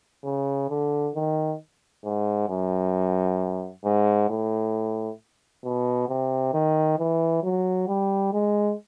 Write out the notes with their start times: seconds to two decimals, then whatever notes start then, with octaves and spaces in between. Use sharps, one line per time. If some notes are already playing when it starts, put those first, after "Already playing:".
0.25 C#3
0.70 D3
1.15 D#3
2.05 G#2
2.49 F#2
3.85 G#2
4.29 A2
5.64 B2
6.09 C3
6.53 D#3
6.99 E3
7.43 F#3
7.88 G3
8.33 G#3